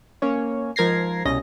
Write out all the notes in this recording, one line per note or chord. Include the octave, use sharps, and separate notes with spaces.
A#3 C#4 C#5
G#2 F3 A#4 G#6 A#6 C7
C2 B2 C#4 D#5 A#6